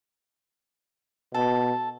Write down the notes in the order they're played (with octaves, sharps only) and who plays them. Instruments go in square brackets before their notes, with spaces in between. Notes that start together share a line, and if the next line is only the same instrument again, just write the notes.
[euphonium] B2 [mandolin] A4